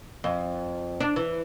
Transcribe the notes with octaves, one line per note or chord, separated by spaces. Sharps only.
F2
D4
E3